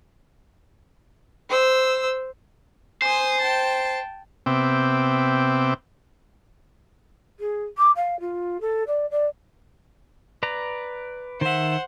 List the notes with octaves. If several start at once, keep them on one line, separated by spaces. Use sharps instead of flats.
C5 E6
C5 G#5 D#6
G5 A5
C3 B3 C4 E5 G5 D6
G#4
D6
F5
F4
A4
D5
D5
B4 D5 A#5
D#3 C5 E5 F#5